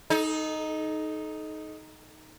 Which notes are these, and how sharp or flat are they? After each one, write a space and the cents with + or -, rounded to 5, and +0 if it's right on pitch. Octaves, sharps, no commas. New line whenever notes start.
D#4 +0 A4 -35